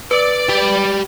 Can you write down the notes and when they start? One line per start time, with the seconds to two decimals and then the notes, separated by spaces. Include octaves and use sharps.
0.11 B4 D5
0.49 G4 B5